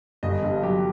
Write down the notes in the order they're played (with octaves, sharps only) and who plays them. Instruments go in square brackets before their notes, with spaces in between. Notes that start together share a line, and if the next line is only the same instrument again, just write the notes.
[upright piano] G1 [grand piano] D#5
[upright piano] G2
[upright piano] F#3 [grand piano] G4